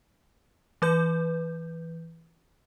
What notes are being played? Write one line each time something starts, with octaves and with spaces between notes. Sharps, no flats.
E3 B4 G6